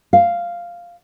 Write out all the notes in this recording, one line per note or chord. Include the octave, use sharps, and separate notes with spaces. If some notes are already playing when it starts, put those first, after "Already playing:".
F5